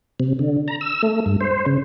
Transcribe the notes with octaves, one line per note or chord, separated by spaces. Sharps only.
C3
D3
A#5
E6
A3
G2
C5
C#3